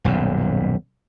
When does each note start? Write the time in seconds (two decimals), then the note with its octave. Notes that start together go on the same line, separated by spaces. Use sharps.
0.04 D#1 B1 F#2